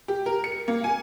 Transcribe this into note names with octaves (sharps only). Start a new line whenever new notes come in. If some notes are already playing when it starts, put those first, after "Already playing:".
G4
A#4
C#7
A#3
G#5